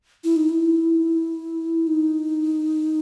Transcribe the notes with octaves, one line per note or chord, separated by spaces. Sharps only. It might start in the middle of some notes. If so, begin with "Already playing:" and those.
E4
D#4
E4
D#4